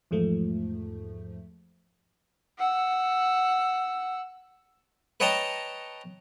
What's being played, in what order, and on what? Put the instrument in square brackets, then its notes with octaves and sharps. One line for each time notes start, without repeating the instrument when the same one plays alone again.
[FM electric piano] E2 G#2 F3 A3
[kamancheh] F#5 E6
[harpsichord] B4 C#5 D#5 G5 A5 A#5